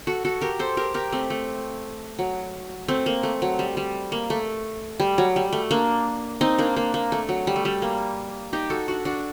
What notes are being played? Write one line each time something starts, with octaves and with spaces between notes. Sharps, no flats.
F#4 A4
F#4 A4
G4 A#4
A4 C5
G4 A#4
G4 A#4
A3 C4
A3
F#3
A3 C4
A#3
A3
F#3
G3
G3
A#3
A3
G3
F#3
G3
A3
A#3 D4
C4 D#4
A#3 D4
A#3
A#3
A3
F#3
G3
A3
G3
A#3
D#4 G4
F#4 A4
D4 F#4
D4 F#4